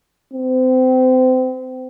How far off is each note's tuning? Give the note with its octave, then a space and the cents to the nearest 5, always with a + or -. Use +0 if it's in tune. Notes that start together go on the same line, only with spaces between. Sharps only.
C4 -30